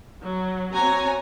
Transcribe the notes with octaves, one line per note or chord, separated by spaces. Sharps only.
F#3
C4 F#4 C#5 G#5 A#5